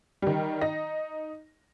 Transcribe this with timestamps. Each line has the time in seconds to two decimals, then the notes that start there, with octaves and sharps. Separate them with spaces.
0.22 D#3 G3
0.61 D#4 A#6